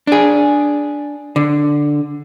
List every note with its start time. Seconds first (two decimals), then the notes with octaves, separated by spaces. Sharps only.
0.07 D4 G#4
1.36 D3